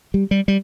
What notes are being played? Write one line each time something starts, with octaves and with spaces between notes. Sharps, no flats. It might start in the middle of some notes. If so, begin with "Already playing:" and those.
G3
G3
G3